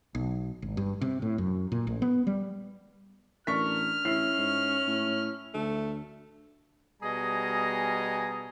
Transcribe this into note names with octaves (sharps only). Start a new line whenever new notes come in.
B1
G#1
G2
C3
A2
F#2
A#2
A1
B3
G3
A1 D4 A#4 C#6 F6 B6
A1 C#4 E4 C7
G#2
A2
D2 A3
B2 G3 G#4 D#5 G#5 A#5